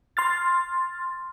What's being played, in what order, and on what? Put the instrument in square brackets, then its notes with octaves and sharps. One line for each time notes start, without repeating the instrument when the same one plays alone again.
[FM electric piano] C6 F6 A6